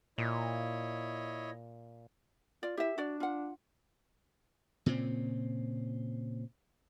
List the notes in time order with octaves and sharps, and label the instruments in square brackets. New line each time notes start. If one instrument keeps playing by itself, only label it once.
[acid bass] A#2 [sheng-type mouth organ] E4 C#5 D#5
[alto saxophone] F4 [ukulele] D5
[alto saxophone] E4 [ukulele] G4 E5
[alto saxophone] D4 [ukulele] F#4 D5
[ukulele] F4 F#5
[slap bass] A#2 C#3 C4